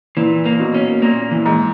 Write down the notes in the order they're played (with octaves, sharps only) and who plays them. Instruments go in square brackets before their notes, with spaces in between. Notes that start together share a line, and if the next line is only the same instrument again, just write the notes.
[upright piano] A#2 [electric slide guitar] E3
[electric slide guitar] A#3
[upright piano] B2
[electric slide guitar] C#4
[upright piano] A#2 [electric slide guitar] A#3
[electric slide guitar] E3
[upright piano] G#2